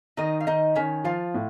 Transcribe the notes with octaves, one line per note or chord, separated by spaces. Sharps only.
D#3 D#4 D#5
F5
D#3 D#4 D#5
D#3 C#4 C#5
F3 F4 F5
A2